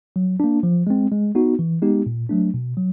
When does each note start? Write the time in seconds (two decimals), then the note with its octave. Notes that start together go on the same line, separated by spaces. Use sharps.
0.16 F#3
0.40 A#3 D4
0.63 F3
0.87 G#3 C4
1.12 G#3
1.35 B3 D#4 F#4
1.59 E3
1.82 G#3 B3 D#4 G4
2.06 A#2
2.29 F#3 A3 D4
2.54 B2
2.77 F#3